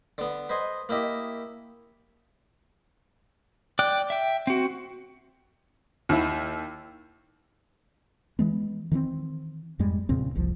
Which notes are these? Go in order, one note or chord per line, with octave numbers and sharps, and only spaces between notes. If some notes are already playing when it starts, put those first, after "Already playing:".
D3 B3
B4 C5 D#5 G#5 C6
A#3 E4 G4 D#5 E5
D5 G5 F#6
E5 G5
C4 F#4
D#2 E4
E3 G#3 B3
D#3 E3 A3 C4
F2 G#2 G3 G#3
E2 A#2 C#3 C4
F#1 C2 F3